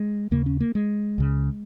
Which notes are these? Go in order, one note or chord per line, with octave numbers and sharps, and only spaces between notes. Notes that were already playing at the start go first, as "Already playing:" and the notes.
Already playing: G#3
D#2 C#3 A#3
C#4
A#3
G#3
C#2 C#3